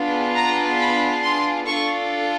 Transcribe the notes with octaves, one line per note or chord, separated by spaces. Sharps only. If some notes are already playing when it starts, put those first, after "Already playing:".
Already playing: B3 D4 F4 G#4
A#5
B5
C6
D4 F4 A4 C#6